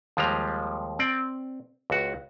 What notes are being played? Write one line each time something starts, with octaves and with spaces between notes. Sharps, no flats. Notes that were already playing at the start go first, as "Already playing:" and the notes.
D#2 F3 G3 G#3 A#5
C4 D5
C#2 F#4